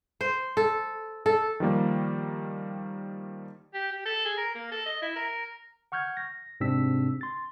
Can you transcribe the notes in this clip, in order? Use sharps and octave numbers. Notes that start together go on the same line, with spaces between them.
C5
A4
A4
D#3 F3 G3 A#3
G4
G4
A4
G#4
A#4
A#3
A4
D#5
E4
A#4
F#5 C#6 F6 G6 G#6
A#6
G#2 C3 C4 D4 E6 B6
C6 A6